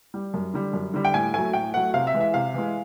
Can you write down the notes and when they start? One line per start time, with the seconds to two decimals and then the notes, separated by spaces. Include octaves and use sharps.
0.14 G3
0.34 F#2
0.54 D3 G3
0.73 F#2
0.94 D3 G3
1.05 G5
1.14 A2 G#5
1.34 F#3 A3 G#5
1.53 A2 G5
1.74 F#3 A3 F#5
1.94 C3 F5
2.07 E5
2.14 E3 G#3
2.20 E5
2.34 C3 F5
2.54 E3 G#3